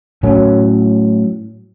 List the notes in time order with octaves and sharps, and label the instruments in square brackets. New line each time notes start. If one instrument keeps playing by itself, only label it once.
[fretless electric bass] A2 F#3 C#4